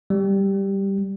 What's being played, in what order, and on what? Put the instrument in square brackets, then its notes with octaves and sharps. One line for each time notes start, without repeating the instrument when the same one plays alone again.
[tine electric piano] G3